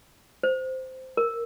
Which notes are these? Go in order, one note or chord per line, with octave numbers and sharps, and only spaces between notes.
C5
A#4